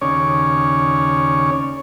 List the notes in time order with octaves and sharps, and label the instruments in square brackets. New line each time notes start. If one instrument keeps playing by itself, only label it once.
[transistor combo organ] D#2 C#3 C#4 C#5 D5